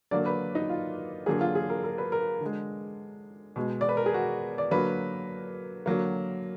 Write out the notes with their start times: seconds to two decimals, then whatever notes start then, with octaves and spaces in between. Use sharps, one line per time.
0.11 D3 F#3 A#3 D5
0.26 B4
0.55 D#4
0.69 F4
1.26 D3 F#3 A#3 G#4
1.41 F4
1.55 G#4
1.70 A#4
1.84 A#4
1.98 B4
2.12 A#4
2.41 D3 G#3
3.56 B2 G#3
3.81 D5
3.89 B4
3.97 A#4
4.06 G#4
4.14 F#4
4.58 D5
4.71 D3 F#3 A#3 B4
5.86 D3 F#3 A#3